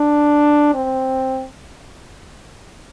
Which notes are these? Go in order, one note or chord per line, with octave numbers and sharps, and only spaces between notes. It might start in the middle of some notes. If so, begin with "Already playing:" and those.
Already playing: D4
C4